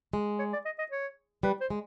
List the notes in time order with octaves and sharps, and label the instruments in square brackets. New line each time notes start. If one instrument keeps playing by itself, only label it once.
[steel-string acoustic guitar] G#3
[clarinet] C#5
D5
D#5
D#5
C#5
[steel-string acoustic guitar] G3 [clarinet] B4
[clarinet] C5
[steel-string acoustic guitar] G#3